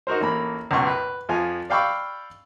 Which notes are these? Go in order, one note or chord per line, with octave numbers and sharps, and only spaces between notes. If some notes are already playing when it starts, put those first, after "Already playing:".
D#4 F#4 A#4 C5
A1 A#3 B5
C#2 F#2 B2 C6 C#6
B4
F2 F3 F4 G#5
D5 F5 G5 B5 C#6 E6